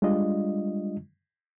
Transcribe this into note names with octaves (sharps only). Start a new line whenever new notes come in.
G3 G#3 D4 F4 D#5